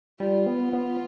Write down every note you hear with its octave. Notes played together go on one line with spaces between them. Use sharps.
G3 F4
B3
B3